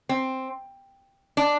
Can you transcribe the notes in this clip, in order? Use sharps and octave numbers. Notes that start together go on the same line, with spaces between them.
C4
D4